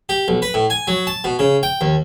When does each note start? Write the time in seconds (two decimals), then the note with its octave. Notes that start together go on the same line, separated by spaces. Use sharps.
0.09 G4
0.28 B1
0.42 B4
0.54 A2
0.70 G#5
0.88 F#3
1.07 A5
1.24 B2
1.39 C#3
1.63 G5
1.81 D#2